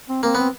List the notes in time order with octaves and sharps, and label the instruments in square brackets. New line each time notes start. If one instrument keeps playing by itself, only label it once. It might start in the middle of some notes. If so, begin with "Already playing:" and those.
[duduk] C4
[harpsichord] A#3 [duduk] C4
[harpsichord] B3 [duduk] C4